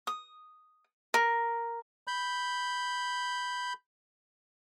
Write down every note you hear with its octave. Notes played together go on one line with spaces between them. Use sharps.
D#6
A#4
B5 G6